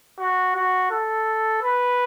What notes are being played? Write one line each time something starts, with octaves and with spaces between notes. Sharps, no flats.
F#4
F#4
A4
B4